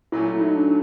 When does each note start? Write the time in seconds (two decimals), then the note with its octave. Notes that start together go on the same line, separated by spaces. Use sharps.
0.12 A#2 F#3 A3 C#4 E4
0.26 E4
0.41 D#4
0.55 D4